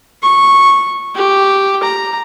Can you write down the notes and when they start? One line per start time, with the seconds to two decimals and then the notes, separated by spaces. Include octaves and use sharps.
0.22 C#6
1.15 G4
1.83 A#5